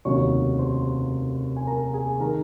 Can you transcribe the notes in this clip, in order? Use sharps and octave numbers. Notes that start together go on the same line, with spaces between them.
F1 D#2 C#3 F#3 C#5 C#6
C5 C6
G#5
A#4 A#5
G#4 G#5
D#3 A#4 A#5